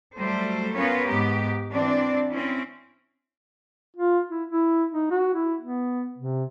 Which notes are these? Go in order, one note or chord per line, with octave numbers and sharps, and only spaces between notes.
F#3 G3 A3 A4 C5
B3 C#4 F4 A#4 B4 C#5
G#2 B3 G4
E3 C4 D4 D5
C4 C#4 E4
F4
E4
E4
D#4
F#4
E4
B3
C3